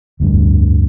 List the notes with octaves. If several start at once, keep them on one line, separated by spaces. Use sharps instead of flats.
F1 D2 G2